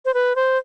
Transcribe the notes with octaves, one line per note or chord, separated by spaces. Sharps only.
C5
B4
C5